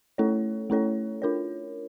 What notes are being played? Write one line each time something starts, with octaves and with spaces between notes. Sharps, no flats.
A3 C#4 E4 A4 C#5
A3 C#4 E4 A4 C#5
D4 F4 A#4 C#5